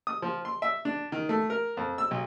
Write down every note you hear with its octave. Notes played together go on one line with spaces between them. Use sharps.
D#6
F3
C6
E5
D4
D#3
A3
A#4
F2
E6
B1